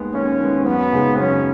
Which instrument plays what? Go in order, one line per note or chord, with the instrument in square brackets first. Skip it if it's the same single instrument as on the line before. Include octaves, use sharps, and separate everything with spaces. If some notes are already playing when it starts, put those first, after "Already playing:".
Already playing: [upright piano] D#2 D#3 G#3 B3
[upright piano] D#2 [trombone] C#4
[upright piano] D#3 G#3 B3
[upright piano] F#2 [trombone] B3
[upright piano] C#3 G#3 D#4 G#4
[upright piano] F#2 [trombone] C#4